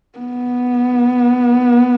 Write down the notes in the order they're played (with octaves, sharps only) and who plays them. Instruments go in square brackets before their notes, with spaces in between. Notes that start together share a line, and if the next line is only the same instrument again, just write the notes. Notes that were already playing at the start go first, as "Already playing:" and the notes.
[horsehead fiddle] B3